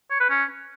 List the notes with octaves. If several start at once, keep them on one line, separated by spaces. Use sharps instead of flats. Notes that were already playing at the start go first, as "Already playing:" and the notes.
C#5
B4
C#4